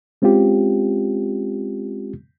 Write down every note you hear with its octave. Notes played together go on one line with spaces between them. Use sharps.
G#3 C4 C#4 F4 G4